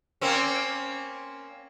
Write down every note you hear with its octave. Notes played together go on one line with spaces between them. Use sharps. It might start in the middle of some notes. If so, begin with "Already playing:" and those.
A#3 C4 C#4